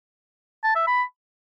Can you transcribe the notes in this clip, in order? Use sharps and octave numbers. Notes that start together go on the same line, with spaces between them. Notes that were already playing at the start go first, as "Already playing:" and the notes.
A5
E5
B5